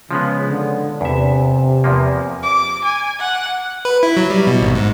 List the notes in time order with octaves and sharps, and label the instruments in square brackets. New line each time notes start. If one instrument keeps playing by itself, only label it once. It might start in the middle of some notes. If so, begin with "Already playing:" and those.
[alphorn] C#3 [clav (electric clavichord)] F3 G#3 B3
[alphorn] D3
[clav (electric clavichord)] E2 E5 [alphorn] C3
[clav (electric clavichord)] E2 F3 A#3
[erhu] D6
G#5
F#5
[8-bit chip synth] B4
E4
F#3
G3
B2
G#1
G#2